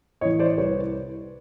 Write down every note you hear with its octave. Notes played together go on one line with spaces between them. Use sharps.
A2 E3 C#5 D#5
C5 D5
C2 B4 C#5